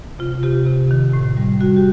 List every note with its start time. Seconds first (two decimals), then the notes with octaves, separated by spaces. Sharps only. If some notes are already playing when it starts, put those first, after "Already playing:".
0.19 C3 F4
0.43 C3 G4
0.66 C3
0.91 D#3
1.13 A2
1.37 G3
1.60 G3 F#4
1.77 G4